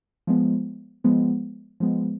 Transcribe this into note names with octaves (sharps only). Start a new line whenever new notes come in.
F3 G#3 B3
F3 G#3 B3
F3 G#3 B3